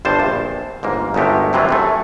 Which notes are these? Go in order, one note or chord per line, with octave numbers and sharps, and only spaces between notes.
G1 G2 C5 A5
A#1
G1 G#2 A#3
G1 F#2 G#3 A3 G4
G2 C3 E3 F#3 F4
F#2 F#3 A3